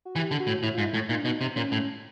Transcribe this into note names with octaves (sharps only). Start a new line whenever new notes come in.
F#4
E3 G4
D3
F#4
A2
A2 E4
G#2 F4
E4
A2
A#2 D#4
D4
B2 D#4
C3
A#2 C#4
A2